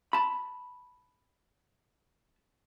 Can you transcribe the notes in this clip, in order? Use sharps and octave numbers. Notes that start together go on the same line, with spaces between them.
A5 B5